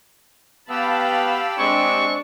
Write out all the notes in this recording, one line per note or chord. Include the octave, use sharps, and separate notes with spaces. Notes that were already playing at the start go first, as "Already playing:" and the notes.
B3 G4 F5 G5 A5 B5 E6
G#3 C4 D4 C#6